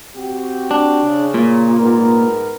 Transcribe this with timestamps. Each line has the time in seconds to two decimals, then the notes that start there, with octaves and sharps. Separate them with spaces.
0.14 C4 F#4 G4
0.71 D4
1.02 C#3
1.34 A#2
1.77 G#2 B3 A#4